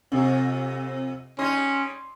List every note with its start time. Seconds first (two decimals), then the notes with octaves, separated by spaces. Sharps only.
0.12 F2 C3
1.39 G3 C#4 D#4 D#5 C6